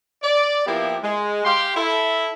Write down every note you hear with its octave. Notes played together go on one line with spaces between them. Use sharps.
D5
F3 A#3 B3 E4 G4
G#3
G4 F5 C6
E4 A4